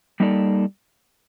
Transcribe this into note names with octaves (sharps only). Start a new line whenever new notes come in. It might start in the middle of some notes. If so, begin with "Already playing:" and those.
G3 A#3 D#4 A4 D5